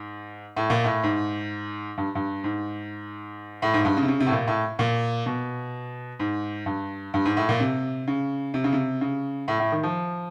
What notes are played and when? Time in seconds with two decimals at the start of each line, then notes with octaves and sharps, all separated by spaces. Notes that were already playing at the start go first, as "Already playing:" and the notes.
Already playing: G#2
0.57 A2
0.70 A#2
0.84 A2
1.03 G#2
1.98 G2
2.15 G2
2.44 G#2
3.62 A2
3.74 G#2
3.85 G2
3.97 C#3
4.03 C3
4.08 C#3
4.20 C3
4.26 A2
4.32 A#2
4.47 A2
4.79 A#2
5.26 B2
6.20 G#2
6.66 G2
7.14 G2
7.25 G#2
7.37 A2
7.49 A#2
7.60 C3
8.07 C#3
8.54 C3
8.64 C#3
8.72 C3
9.01 C#3
9.48 A2
9.60 A2
9.72 D#3
9.83 F3